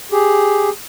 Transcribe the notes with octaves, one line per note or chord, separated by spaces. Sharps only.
G4 G#4